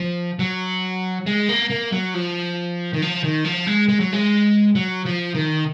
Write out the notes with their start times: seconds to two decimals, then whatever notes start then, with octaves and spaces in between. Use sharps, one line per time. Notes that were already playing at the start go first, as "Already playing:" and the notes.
Already playing: F3
0.39 F#3
1.26 G#3
1.49 A#3
1.70 A#3
1.92 F#3
2.14 F3
2.93 D#3
3.02 F3
3.24 D#3
3.45 F3
3.66 G#3
3.88 G#3
4.00 F#3
4.13 G#3
4.75 F#3
5.06 F3
5.35 D#3